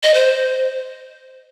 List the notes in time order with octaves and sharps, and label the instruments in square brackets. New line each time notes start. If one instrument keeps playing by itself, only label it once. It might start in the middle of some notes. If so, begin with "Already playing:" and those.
[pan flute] D#5
C5